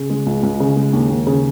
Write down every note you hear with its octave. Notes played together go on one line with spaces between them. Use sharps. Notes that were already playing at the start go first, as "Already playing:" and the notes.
Already playing: C#3
G#3
C#2
C#2
C#3
G#3
D#2
D#2
C#3